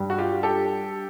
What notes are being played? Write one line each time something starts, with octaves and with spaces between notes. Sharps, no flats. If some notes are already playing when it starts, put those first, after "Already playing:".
Already playing: G2
F#4
F4 G4
G4 A4